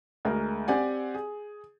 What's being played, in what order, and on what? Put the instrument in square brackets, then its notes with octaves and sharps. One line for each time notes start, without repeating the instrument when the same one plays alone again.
[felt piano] D2 G#3 A#4
C4 G4 D5 F#5 G#5
G#4